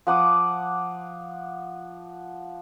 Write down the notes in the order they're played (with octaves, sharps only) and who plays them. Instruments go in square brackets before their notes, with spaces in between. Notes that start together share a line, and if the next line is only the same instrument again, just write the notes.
[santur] F3 F#5 D6 D#6